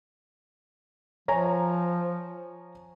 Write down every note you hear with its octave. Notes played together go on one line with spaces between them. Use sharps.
F3 C#5 G#5 A#5